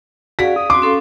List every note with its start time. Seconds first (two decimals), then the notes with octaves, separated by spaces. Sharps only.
0.39 F#4 G#4 D5 F5 B6
0.56 D#6
0.70 C4 F#4 C6 D6
0.82 C#4 A4 F5 C6